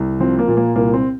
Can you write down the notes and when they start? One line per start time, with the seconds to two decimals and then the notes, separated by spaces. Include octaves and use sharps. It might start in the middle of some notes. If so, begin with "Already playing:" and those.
Already playing: C2
0.20 F3 C4
0.39 A#3
0.48 A#2
0.57 A#3
0.76 C2 A#3
0.93 C4